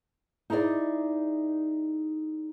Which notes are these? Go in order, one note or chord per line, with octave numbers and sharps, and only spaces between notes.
D#4 E4 G#4 B4 D5 D#5